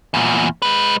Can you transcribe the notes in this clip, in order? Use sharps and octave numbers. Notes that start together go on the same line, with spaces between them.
E2 A#2
G#3 B4